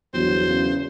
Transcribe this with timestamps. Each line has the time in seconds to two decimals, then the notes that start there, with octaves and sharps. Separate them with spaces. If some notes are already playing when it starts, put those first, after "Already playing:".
0.14 G1 E2 F#3 C5
0.49 C#3